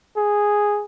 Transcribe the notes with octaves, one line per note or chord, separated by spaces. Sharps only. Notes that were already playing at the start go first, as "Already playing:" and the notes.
G#4